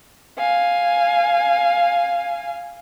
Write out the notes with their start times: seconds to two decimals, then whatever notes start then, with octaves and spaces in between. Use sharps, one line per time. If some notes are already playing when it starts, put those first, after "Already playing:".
0.37 F5 G#5